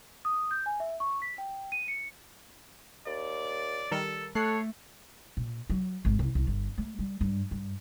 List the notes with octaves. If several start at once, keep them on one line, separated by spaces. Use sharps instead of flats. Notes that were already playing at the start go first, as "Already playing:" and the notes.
D#6
G6
G#5
E5
C#6
B6
G5
D#7
C#7
D#2 D5
D#3 G3 A4 A#4
A3 A4 C#5 F#6 C7
A#2
F#3
G#1
C2
C2
G1
A3
G3
G2
G2